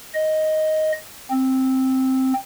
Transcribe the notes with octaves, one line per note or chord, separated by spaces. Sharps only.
D#5
C4